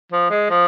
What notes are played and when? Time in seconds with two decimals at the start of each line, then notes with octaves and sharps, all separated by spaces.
0.12 F3
0.30 G#3
0.50 F3